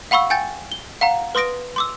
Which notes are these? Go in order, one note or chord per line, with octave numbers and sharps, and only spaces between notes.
F5 F#5 B5 C#6 E6
G5 G#5 G6 A6
G7
F5 F#5 A#5
B4 C6 D#6 A#6 D7
C6 D6 E6